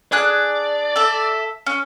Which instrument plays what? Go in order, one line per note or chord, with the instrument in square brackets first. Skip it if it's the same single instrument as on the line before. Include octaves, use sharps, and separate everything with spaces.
[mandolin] D4 G#4 F#6 [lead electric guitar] D5
[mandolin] A4 E5
C#4